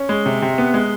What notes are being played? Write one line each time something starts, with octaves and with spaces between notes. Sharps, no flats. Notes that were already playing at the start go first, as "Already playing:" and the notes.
Already playing: C#4
G#3
C3
C3
B3
G#3